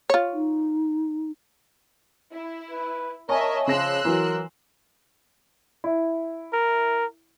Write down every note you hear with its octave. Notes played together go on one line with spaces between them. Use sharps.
F4 C#5
D#4
E4
B4
A#4 C#5 D#5 E5 G#5 A5
C#3 F3 C6 E6 F#6 A#6
E3 F#3 A#4
E4
A#4